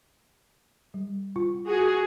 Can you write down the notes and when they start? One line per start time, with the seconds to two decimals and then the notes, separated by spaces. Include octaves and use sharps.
0.94 G3
1.36 F4
1.67 F#4 G#4